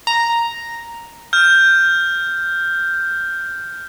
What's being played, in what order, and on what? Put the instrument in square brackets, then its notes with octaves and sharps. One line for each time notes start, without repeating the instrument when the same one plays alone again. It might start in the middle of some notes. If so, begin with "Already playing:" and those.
[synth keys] A#5
[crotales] F6 G6